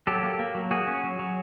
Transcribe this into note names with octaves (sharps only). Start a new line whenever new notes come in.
F#3 G4 A4
A#3
A#3
F#3
A#3 F#4 G#4
C#4
F#3
F#3